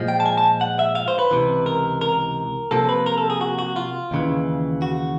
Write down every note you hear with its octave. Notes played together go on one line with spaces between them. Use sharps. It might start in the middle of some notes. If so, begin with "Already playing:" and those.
Already playing: A#2 F3 G#3
G5
A5
G#5
A5
F#5
E5
F5
C5
B4
C#2 C3 E3
A#4
A#4
C3 F3 A#3 A4
B4
A#4
A4
G#4
F#4
F#4
F4
D#2 C#3 E3
F#4